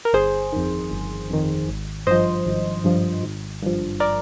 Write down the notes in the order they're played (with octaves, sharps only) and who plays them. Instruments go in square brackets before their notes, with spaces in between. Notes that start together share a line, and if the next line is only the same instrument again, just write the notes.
[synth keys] A#4
G1 G#4 C5
F2 D#3
G1
F2 D#3
G#1
G2 F3 C5 D#5
G#1
G2 F3
G#1
G2 F3
A#4 D5